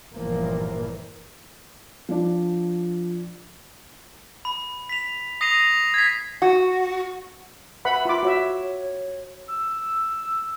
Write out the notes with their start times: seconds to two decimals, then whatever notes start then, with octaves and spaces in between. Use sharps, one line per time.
0.12 G1 A#2 E3 F3 A#3
2.09 F3 D4
4.45 B5
4.89 B6 F7
5.41 D#6 A#6 C7 D#7 F7
5.94 G#6 B6
6.42 F#4
7.85 B4 E5 F#5 B5
8.05 F4 B5 D6
8.23 F#4 C#5 E5
9.48 E6